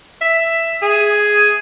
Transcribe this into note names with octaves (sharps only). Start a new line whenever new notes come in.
E5
G#4